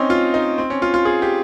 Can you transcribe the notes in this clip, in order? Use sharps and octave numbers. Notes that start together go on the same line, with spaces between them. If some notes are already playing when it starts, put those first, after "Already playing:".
Already playing: C4 C#4 D#4
F4
D#4
C4
C#4
F4
F4
G#4
G4